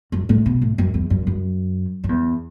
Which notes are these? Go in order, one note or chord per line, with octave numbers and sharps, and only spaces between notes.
F#2
A2
B2
A2
F#2
E2
F#2
F#2
F#2
E2